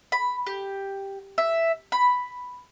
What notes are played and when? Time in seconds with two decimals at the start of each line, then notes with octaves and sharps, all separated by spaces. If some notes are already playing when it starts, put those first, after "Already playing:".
0.12 B5
0.47 G4
1.38 E5
1.92 B5